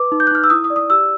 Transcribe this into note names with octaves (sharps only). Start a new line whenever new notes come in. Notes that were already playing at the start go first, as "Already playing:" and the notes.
Already playing: B4 D6
D#4
G6
F#6
D#4 F6
E6
E4 D#6
D#6
D5
D#6
G4 E6